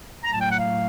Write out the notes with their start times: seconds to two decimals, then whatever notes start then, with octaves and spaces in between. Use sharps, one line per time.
0.24 A2 F#3 A3 A#5
0.33 A5
0.41 G5
0.50 F#5
0.59 F5